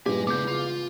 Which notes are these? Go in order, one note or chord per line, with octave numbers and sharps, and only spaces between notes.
E2 G2 A#2 G#3 G4 G#5
C#2 B3 G#4 D6 G6
F4